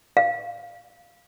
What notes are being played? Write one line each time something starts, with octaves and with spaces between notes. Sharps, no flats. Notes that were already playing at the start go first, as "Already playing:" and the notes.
F5